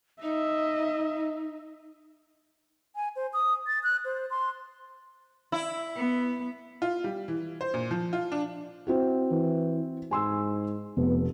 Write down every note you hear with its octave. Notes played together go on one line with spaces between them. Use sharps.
D#4 D#5 E5
G#5
C5
D#6
A6
F#6
C5
C6
E4
B3
F4
G3
E3
C5
A#2
F3
F4
D4
C4 E4 F#4
E3
G#2 G#5 C6 E6
F1 B3